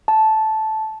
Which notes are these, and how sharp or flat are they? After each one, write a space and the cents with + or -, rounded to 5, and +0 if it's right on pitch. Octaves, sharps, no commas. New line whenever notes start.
A5 -10